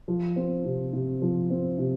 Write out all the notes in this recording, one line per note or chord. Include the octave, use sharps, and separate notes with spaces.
F3
C4
C3
C3
F3
C4
C3